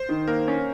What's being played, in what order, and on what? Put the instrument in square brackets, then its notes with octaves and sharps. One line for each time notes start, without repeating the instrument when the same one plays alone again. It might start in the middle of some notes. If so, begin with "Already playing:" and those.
Already playing: [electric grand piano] C5
[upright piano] D#3
[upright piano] A#3 [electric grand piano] A#4
[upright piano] C#4